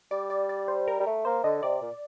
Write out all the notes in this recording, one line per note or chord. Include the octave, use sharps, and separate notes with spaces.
G3 D5
D5
D5
C5
A#4
G3
A3
A#3 C5
D3 D#5
C3 D5
A#2